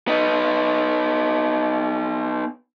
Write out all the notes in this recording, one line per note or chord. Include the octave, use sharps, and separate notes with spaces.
B3 D#4